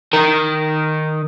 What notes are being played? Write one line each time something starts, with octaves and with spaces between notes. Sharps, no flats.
D#3 A#4